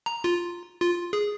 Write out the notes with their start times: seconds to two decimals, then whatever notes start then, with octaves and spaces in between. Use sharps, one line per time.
0.06 A#5
0.24 F4
0.80 F4
1.13 G#4